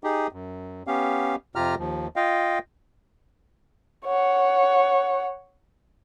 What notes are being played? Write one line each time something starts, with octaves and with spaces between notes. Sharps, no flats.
D#4 G4 G#4
F#2
B3 C#4 G4 F5
F2 C3 F4 G4 A#5 F6
D#2 F3
F4 D#5 F5 G5
C#5 F#5